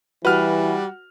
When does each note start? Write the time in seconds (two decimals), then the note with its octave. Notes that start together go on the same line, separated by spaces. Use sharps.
0.25 E3 G3 F#4 B4 F6